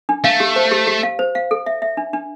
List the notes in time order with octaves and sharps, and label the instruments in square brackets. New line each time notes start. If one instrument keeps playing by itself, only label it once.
[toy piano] D4
[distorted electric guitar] A3 [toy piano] F5
[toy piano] G4
C5
G4
G4
F5
C5
F5
A4
E5
E5
D4
D4